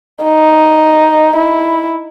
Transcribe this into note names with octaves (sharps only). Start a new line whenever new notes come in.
D#4
E4